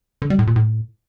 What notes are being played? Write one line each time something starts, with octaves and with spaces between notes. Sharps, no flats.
D3
G3
A2
A#2
A2